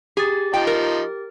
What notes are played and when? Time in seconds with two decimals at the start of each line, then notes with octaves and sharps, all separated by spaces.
0.17 G4 G#4 A6
0.54 F3 D#4 G5
0.67 A#4